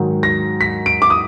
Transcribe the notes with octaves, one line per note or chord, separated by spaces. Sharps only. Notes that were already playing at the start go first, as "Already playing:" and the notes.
Already playing: G#2 D#3 F#3
A#6
B6
D7
D6
D#6